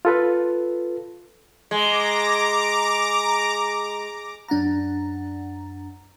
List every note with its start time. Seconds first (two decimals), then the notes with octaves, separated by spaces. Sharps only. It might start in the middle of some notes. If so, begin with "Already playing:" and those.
0.05 F4 A4 B4
1.71 G#3 A#5 D6
4.48 F#2 D4 F#5 A#5